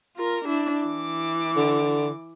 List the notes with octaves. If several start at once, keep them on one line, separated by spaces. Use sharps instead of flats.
F4 A#4
D4 E4
E3 D6
D3